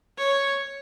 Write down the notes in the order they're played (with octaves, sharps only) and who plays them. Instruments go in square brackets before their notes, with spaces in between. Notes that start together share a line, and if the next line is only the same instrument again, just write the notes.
[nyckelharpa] C#5